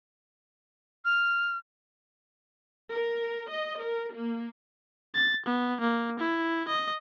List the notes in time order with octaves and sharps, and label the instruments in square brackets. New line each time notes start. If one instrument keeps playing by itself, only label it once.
[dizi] F6
[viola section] A#4
D#5
A#4
A#3
[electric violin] A6
B3
A#3
E4
D#5